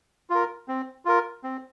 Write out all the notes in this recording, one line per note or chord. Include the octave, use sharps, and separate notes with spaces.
F4 A#4
C4
F4 A#4
C4